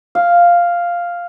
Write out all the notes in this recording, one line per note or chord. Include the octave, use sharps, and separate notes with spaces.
F5